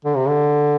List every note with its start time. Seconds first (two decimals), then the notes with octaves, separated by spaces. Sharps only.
0.05 D3
0.16 C3
0.28 D3